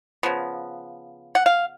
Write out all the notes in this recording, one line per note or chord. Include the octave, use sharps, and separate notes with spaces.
C#3 F3 B3
F#5
F5